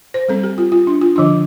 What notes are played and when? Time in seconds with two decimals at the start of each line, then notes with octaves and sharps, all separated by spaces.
0.14 C5
0.28 G3 C4 A4
0.43 G4
0.58 F4
0.72 F4
0.87 D4
1.02 F4
1.16 D3 F3 D4